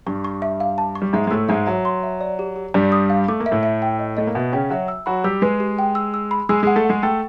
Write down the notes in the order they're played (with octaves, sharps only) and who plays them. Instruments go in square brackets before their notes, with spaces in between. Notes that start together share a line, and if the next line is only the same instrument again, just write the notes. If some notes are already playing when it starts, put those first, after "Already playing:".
[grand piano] G2 G3 [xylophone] C#6
[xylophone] C#6
E5
F5
A5
C#6
[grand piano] G3
[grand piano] G#2 G#3 [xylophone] E5
[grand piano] G#3
[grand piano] A2 A3 [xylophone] E6
[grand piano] G#2 G#3 [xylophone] E5
[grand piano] F#3 [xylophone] E5
[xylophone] C6
E5
D5
G4
G4
[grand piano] G2 G3 [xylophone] D5
[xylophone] D#6
F5
[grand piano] A3 [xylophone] D6
[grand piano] A#3
[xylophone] E5
[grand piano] A2 A3
[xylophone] E5
G5
D#5
[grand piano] A3 [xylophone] D#5
[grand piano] A#3
[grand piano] B2 B3 [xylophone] E5
[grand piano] C#3 C#4 [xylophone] G5
[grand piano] F#3 F#4 [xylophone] E5
[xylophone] E6
[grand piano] F#3 F#4 [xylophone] B5
[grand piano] G3 G4 [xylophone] E6
[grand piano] G#3 G#4 [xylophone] B4
[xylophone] G4
G5
E6
E6
B5
[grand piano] G#3 G#4 [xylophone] E6
[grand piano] G#3 G#4 [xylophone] F#5
[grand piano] A3 A4
[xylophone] F#5
[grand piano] G#3 G#4
[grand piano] A3 A4 [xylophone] G5